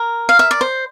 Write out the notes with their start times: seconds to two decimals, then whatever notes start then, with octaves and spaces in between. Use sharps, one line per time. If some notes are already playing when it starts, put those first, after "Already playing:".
Already playing: A#4
0.29 F5
0.39 E5
0.51 D5
0.61 C5